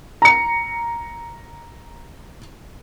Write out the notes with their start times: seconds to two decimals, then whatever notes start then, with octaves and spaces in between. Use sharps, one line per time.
0.22 A#5 C#7